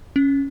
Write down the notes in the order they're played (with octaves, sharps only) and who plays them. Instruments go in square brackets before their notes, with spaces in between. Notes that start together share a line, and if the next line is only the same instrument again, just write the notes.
[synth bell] C#4